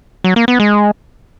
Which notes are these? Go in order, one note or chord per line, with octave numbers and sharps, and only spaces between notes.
F#3
A#3
B3
G#3